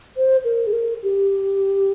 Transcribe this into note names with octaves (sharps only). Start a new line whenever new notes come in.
C5
A#4
G#4
A#4
G4